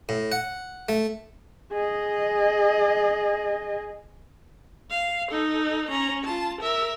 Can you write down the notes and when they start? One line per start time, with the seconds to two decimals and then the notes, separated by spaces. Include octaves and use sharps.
0.09 A2
0.32 F#5
0.89 A3
1.72 G#4 D#5
4.90 F5
5.32 D#4 A4
5.89 C#4 A#5
6.24 F4 A5
6.61 A#4 E5